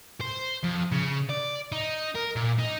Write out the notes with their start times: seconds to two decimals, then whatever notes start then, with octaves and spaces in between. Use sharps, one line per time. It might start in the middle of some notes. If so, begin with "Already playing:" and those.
0.21 C5
0.64 F2
0.92 C#3
1.30 D5
1.72 D#4
2.15 A#4
2.36 A#2
2.59 D#4